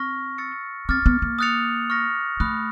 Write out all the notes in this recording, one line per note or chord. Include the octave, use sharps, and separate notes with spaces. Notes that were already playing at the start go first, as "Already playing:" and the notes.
Already playing: C4 C#6 F6 A#6
E6 A6 C#7
C4 D6 F6 A6
B3
A#3
D#6 F#6 A6 C#7 F7
C#6 F6 A#6 C#7
A3 B5 D#6 F#6